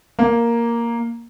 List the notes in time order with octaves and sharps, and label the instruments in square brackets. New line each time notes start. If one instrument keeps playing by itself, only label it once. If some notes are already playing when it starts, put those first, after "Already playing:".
[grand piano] A#3